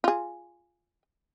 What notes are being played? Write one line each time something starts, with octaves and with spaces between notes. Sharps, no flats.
F4 G#4